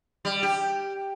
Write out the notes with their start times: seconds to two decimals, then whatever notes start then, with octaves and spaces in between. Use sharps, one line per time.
0.25 G3
0.43 G4